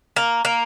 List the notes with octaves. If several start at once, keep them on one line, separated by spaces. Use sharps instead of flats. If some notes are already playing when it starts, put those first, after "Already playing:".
A#3
A#3